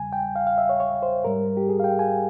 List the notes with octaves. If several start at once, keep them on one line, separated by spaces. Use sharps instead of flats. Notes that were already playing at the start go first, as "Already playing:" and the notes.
Already playing: E2 C#3 G3 G#5
G5
F5
F5
E5
C#5
C#5
C5
G#2 G3 A#4
G4
G#4
F5
G5
G#5